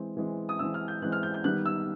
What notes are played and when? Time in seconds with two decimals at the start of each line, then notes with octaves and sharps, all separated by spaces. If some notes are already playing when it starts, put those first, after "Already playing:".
Already playing: E3 G#3 C4
0.17 E3 G#3 C4
0.49 D#6
0.59 E3 G#3 C4 E6
0.74 F6
0.88 G6
1.02 E3 G#3 C4 F#6
1.12 F6
1.23 G6
1.34 G6
1.44 D#3 G3 B3 F#6
1.66 E6